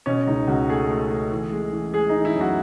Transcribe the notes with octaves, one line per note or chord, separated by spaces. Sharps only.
B2 C#4
C#2 D#4
C#2 F#4
A3 G#4
A3
A3
E3
G#3
E3
G#3 G#4
E3 D#4
E4
F#2
F#4